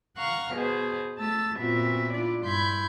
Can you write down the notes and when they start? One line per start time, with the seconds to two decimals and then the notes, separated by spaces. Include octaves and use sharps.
0.17 F5 F#5 A#5 C#6 F6
0.54 B2 B3 G#4 C5
1.18 A3 A5 E6 A6
1.59 A#2 B3 C4 F4 F#4 E5
2.13 D4 E4 F4 D5
2.42 G2 E4 B5 C6 G6 G#6